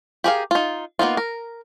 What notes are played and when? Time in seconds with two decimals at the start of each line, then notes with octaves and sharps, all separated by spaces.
0.24 G4 G#4 A#4 F5
0.51 D#4 F4
0.99 A#3 B3 D#4 F4
1.17 A#4